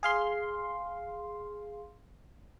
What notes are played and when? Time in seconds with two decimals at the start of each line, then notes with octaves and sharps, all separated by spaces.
0.03 G#4 F5 C6